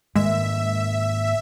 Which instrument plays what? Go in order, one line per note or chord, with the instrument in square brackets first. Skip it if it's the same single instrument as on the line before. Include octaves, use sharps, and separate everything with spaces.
[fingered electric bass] G#2 D#3 A#3 [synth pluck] G#3 [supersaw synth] E5